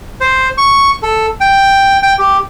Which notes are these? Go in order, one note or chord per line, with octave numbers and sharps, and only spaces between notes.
C5
C#6
A4
G5
G5
G4